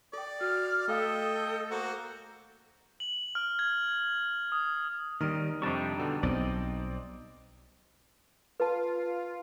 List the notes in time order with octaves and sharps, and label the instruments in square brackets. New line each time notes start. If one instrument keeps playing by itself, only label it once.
[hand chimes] A4 G5 [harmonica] D5
[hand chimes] F#4 A4 [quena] F6
[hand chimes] A3 F5 D#6 [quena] A4 [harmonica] D#5 G5
[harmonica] A#3 F#4 C5
[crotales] F#7
F6
G#6
D#6
[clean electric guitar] D#2 [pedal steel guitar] D#3 G3 [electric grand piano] D#6 F6
[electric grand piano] F2 C3 [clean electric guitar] G3 D4 D#4 [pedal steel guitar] G5 A5 C#6
[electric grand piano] B2 D3
[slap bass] B1 [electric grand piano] C4 [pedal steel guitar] D5 D#5
[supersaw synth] F4 [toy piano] B4 A5